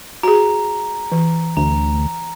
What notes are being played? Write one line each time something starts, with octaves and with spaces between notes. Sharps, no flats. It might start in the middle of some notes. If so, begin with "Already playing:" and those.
F#4 G#4 A#5
E3
D2 A#5